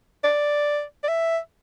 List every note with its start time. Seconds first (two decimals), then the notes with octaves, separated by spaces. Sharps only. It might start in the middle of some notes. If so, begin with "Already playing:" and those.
0.24 D5
1.03 D5
1.09 E5